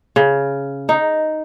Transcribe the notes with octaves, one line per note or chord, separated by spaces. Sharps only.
C#3
D#4